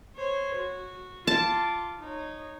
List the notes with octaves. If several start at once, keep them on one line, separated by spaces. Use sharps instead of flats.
C5 C#5
F#4
F4 A5 D6
D#4 C#5